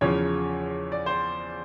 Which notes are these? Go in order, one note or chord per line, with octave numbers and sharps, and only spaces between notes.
E2 C#3 F3 C#5
D5
C5